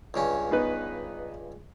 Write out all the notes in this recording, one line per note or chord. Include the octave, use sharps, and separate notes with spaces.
C#2 G2 C#4
B3 D#4 B4